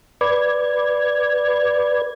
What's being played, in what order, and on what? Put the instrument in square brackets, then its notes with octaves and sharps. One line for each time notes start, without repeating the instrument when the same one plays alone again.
[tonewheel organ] B4 D5 G#6